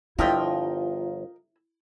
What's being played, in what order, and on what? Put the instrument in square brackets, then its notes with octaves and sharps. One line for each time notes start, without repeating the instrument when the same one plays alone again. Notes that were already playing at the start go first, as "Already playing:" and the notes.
[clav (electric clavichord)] G1 F3 E5 [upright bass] E4 [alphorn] F4 [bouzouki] A#4 D#5 G5